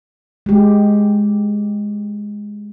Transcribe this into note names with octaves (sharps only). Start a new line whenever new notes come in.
G#3 G4